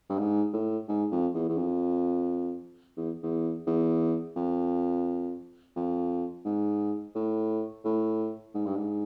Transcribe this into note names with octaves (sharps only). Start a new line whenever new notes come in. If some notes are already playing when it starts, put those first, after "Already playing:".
G2
G#2
A2
G#2
F2
E2
E2
F2
E2
E2
E2
F2
F2
G#2
A2
A2
G#2
G2
G#2